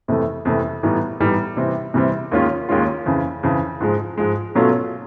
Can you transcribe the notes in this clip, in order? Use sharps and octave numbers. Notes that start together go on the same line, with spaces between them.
F2 C3 E3 A3
F2 C3 E3 A3
A2 E3 G3 B3 D#4
A2 E3 G3 B3 D#4
C3 E3 G3 C4
C3 E3 G3 C4
D#2 D#3 G#3 C#4 F4
D#2 D#3 G#3 C#4 F4
F2 C#3 E3
F2 C#3 E3
G#2 F3 G#3
G#2 F3 G#3
B2 F#3 A3 C#4 F4